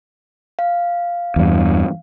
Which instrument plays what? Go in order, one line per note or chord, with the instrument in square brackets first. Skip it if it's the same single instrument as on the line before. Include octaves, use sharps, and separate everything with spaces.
[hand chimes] F5
[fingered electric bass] E2 G2